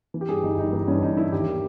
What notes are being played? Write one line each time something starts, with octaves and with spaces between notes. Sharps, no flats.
E3
G4
G2 G#4
G1 D#4
G1 D#4
E3 D#4
G2 C#4
G1 D#4
G1 E4
D#2 G4
D#3